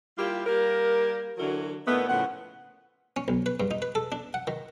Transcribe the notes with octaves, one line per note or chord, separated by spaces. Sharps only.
G3 A#3 E4 F4 G4
G3 A#3 A#4
D3 E3 F#3 F#4 A#4
A#2 D#3 A3 B3
A2 C#3 F3 F#5
C#4
B1
B4
G2
D#4
B4
A4
D4
F#5
D#3